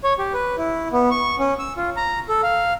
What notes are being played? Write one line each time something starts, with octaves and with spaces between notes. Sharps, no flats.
C#5
G4
B4
E4
B3
C#6
C#4
E6
F4
A#5
A4
F5